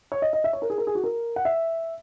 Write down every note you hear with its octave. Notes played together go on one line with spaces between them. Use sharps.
C#5
D#5
D#5
E5
C#5
A#4
G#4
A#4
G#4
F#4
A#4
F#5
E5